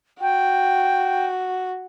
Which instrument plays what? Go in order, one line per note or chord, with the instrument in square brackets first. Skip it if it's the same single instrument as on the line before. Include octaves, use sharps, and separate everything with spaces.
[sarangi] F#4 [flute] G5